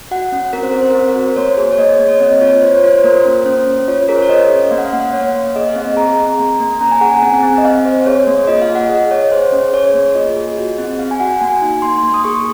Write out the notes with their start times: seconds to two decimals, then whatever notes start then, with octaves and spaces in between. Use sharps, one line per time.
0.11 F#4 F#5
0.32 C#4
0.53 C4 A#4
0.63 C5
0.71 C4 A#4
0.81 C5
0.91 A#4
0.95 C4 C5
1.08 A#4
1.15 F#4
1.29 C5
1.36 A#3 C#5
1.57 G#4
1.72 C#5
1.79 A#3 D#5
1.99 A#3
2.09 C#5
2.20 C4 D#5
2.41 F4 C#5
2.62 F4 C5
2.75 C#5
2.84 F4 C5
2.98 C5
3.04 A#3 A#4
3.25 C#4
3.45 C#4 C5
3.67 C#4
3.88 F4 C#5
4.08 G#4 A#4
4.15 C5
4.22 C#5
4.29 C#4 D#5
4.50 C#4
4.71 A#3 F5
4.78 F#5
4.85 F5
4.93 A#3 F#5
5.00 F5
5.13 A#3 C#5
5.35 A#3
5.56 G#4 D#5
5.68 F5
5.76 C4
5.82 D#5
5.96 G#4 A#5
6.18 C4
6.39 A#3
6.60 A#3
6.81 C#4 A#5
6.91 G#5
7.01 G#4 F#5
7.11 G#5
7.22 C4
7.43 C4
7.58 D#5
7.65 C4 F5
7.85 C4 C5
8.06 G#4 C#5
8.27 A#3
8.47 F4 D#5
8.62 F5
8.69 G#4
8.75 F#5
8.89 G#4 D#5
9.11 G#4 C#5
9.32 G#4 C5
9.52 C#4
9.73 G#4 C#5
9.94 A#3
10.15 F4 D#5
10.37 G#4
10.57 F#4
10.78 C4
10.99 F#4 F5
11.11 G#5
11.20 F#4 F#5
11.41 A#3 G#5
11.62 D#4
11.82 A#3 C6
12.03 A#3
12.14 D#6
12.24 G#4 C#6